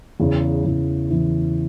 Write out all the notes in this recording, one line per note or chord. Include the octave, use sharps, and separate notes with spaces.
E2 C#3 E3
E2 C#3 E3
E2 C#3 E3